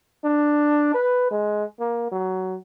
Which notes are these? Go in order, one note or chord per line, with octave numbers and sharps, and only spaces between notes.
D4
B4
G#3
A#3
F#3